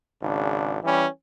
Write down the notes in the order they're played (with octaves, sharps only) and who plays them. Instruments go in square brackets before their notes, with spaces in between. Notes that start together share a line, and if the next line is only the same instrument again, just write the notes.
[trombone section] G#1 C#3 D4
E3 G3 C#4